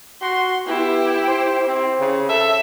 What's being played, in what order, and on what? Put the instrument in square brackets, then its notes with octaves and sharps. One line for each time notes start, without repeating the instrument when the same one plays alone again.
[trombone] F#4 [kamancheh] C6
[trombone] B3 [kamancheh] E4 G4
[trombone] C5
C4
C#3
[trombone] A4 [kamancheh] E5